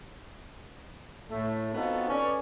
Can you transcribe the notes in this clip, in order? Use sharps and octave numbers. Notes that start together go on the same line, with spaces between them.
A2 A3
B3 C4 D#4 F4 F#4 A4
C#4 A4 B4 C#5 D5